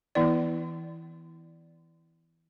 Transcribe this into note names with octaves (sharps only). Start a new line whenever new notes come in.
E3 B3 E4 D5